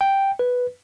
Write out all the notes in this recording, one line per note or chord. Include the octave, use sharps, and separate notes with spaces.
G5
B4